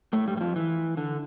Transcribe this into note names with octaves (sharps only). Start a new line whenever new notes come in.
A2 A3
G2 G3
G3
F2 F3
E3
D3